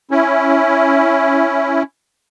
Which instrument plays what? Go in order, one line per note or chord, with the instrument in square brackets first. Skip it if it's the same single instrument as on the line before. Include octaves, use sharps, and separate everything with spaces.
[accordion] C#4 E4